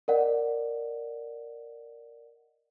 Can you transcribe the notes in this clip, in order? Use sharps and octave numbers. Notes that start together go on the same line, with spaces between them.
A#4 D5 D#5 F#5